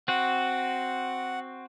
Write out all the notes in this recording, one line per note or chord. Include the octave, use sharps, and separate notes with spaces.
C4 F#4 F#5